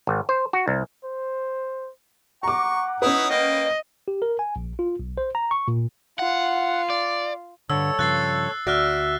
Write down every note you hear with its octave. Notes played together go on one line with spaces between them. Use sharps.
G#1
C5
F#4
C2
C5
F#5 A#5 C#6 D6
C#4 D#4 E4 B4 D#6
A#3 D#5 G5
G4
A#4
G#5
A#1
F4
B1
C5
A#5
C#6
A#2
F4 F#5
D5
G2 D3 A4 C#5 E6
G2 C#3 F3 F#6 A6 C7
D2 F#4 D5 E5 F6 F#6 A#6